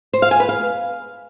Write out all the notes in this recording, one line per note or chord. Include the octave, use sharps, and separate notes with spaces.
C5
F5
G#5
B4
F5